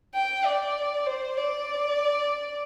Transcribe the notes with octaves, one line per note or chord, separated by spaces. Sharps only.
G5
D5
C5
D5